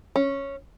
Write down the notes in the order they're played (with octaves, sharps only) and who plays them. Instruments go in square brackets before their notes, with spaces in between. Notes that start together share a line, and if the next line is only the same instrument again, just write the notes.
[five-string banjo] C#4